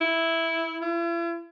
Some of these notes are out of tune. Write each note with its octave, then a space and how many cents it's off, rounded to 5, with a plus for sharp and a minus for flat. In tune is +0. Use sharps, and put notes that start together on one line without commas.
E4 -5
E4 +45